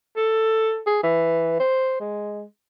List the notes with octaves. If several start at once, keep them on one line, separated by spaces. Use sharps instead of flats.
A4
G#4
E3
C5
G#3